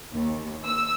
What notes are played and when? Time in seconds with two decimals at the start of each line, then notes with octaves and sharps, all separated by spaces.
0.13 D#2
0.65 E6